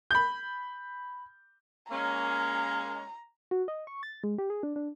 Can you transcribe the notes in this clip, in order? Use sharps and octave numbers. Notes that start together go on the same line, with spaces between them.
B5 G6
G#3 A#3 C#4 A#5
F#4
D#5
C#6
A6
G#3
G4
G#4
D4
D4